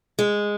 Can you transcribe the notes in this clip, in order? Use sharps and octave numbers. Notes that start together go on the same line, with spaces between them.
G#3